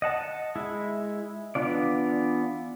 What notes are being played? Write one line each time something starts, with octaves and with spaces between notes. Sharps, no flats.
D#5 F#5 A5
G#3 E4
E3 B3 D4 F4 D5